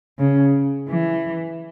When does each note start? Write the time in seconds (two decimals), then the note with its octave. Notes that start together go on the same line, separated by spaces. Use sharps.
0.19 C#3
0.89 E3